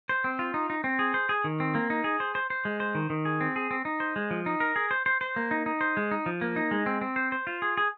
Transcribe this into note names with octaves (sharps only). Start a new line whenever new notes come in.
C5
C4
F4
D#4
D#4
C4
G#4
C5
G#4
D#3
C4
A#3
D#4
G#4
C5
C5
C5
G#3
C5
D#3
D#3
G#4
C4
G#4
C4
D#4
C5
G#3
F3
D#4
A#4
G#4
C5
C5
C5
A#3
D#4
D#4
C5
G#3
D#4
F3
A#3
D#4
G#3
C4
C4
C5
C5
F4
G#4
G#4